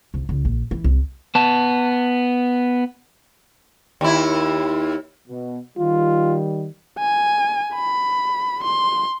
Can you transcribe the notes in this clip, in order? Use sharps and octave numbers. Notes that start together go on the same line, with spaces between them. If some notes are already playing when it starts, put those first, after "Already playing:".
C2
C#2
A#1
E3
C2
B3 A5
D#2 E4
B2
D#3 G3 F4
G#5
B5
C6